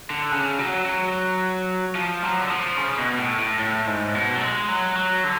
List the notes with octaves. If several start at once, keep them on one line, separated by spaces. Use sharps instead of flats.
D3
C#3
F#3
F#3
F3
F#3
D3
F3
C#3
B2
A2
A2
A2
G#2
B2
F#3
G#3
F#3
F#3
D3